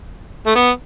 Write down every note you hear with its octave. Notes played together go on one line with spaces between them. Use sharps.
A3
B3